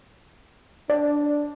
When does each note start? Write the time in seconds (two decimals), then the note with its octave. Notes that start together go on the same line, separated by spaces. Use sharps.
0.90 D4 D5